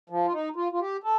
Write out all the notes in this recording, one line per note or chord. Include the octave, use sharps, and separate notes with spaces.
F3
F4
D#4
F4
F4
G4
A4